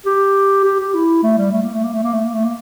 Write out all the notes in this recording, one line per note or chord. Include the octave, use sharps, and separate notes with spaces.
G4
G4
G4
E4
A3
G3
A3
A#3
A3
A#3
A3
A#3
A3
A#3
A3
A#3